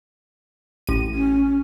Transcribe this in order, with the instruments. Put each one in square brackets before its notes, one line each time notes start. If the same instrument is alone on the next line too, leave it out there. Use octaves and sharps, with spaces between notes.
[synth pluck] A1 D#7
[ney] C#4